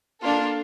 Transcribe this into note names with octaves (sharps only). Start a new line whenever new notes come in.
A#3 D4 F4 A4